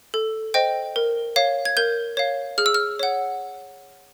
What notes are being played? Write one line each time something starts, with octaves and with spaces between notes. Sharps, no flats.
A4
C5 D#5 G5
A#4
C#5 F5
G#6
A#4 G6
C#5 F5
G#4 F6
E6
F6
C#5 F#5